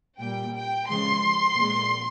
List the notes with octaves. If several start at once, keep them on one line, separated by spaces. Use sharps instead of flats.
A#2 G3 G5
G5
C#3 F3 G#3 C6
A#2 F3 G#3